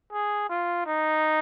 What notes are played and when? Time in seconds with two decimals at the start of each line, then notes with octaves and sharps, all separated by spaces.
0.13 G#4
0.49 F4
0.87 D#4